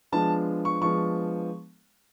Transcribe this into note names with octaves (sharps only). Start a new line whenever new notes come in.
F3 G#3 B3 D4 A5
C#6
F3 G#3 B3 D4 C#6